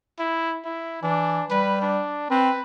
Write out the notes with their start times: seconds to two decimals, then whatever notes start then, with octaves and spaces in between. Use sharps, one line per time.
0.19 E4
0.65 E4
1.03 E3 D4
1.50 G3 B4
1.82 D4
2.30 C4 B4